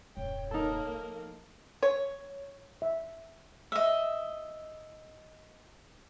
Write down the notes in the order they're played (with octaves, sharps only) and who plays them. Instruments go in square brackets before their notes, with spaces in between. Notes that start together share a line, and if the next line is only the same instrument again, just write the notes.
[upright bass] D#1 F#2 [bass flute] C#5 [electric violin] G5
[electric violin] A#3 A#4 [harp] D#4 A4
[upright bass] F3
[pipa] C#5
[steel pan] E5
[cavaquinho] D#5 E5